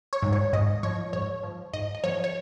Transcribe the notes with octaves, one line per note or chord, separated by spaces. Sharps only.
C#5
G#2
C#5
G#2 D#5
F3 C#5
G#2 C#5
F3
G#2 D#5
D#5
F3 C#5
C#5